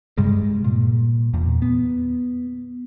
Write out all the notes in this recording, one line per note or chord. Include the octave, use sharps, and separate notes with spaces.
G2 C3 G3 G#3
A#2
E2 A#2
B3